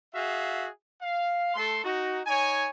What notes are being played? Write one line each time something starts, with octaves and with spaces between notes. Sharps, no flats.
F#4 G#4 E5 F5
F5
A3 A4 C6
D#4 F#4
D#4 C#5 G#5